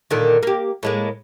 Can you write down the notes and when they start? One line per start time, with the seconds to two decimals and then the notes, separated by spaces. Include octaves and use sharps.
0.11 A#2 D3 D#3
0.43 A#3 G4
0.83 A2 G#3 A#3